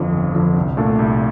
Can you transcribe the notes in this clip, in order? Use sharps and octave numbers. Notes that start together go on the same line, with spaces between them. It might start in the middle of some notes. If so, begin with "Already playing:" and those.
Already playing: G1 F2 D3 F3
G1
F2 D3 F3
C2
A#2 A3 D4 A4
C2